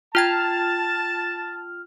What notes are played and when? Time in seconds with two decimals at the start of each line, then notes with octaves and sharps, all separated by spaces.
0.15 F4 G5 A5 F6 G#6